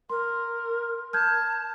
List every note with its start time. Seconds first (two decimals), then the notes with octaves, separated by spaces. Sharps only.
0.10 A#4 C6
1.13 A5 F6 G6 G#6